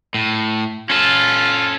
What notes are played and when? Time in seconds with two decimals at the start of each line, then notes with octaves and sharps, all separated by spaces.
0.14 A2
0.90 C#4 F4 A4